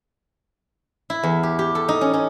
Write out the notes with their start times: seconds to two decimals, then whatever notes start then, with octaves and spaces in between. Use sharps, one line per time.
1.10 E4
1.23 E2
1.43 G4
1.59 G4
1.75 A4
1.89 D#4
2.01 C#4
2.13 C#4